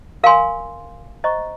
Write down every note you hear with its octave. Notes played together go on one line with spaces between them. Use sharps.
A#4 F5 G#5 C6
C5 D#5 A#5 C#6